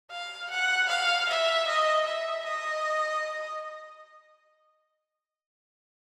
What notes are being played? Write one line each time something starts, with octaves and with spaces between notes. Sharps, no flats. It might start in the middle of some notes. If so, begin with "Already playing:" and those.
F5
F#5
F5
E5
D#5
E5
D#5